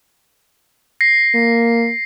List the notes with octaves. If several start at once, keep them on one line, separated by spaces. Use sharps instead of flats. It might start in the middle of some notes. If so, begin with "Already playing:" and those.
A#6 C7
A#3